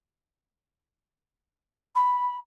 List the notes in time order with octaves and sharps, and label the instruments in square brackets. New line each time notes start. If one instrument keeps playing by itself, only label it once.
[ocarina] B5